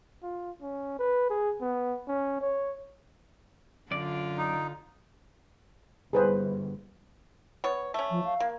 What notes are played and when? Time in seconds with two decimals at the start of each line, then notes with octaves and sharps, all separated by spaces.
0.23 F4
0.62 C#4
0.99 B4
1.30 G#4
1.61 B3
2.08 C#4
2.41 C#5
3.91 F#2 D3 F4 D5
4.38 D#4
6.13 G1 G#4 B4 C5
7.64 B3 C#5
7.94 A3 C#4
8.11 F3
8.24 F5
8.40 A#3